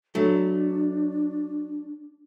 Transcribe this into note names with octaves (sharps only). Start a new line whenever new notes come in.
F#3 A3 D4